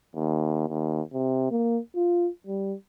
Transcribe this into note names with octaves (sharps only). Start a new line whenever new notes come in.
D#2
D#2
C3
A#3
F4
G3